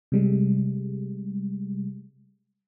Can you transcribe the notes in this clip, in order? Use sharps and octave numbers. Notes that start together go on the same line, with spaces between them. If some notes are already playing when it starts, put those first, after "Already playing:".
C3 G3 G#3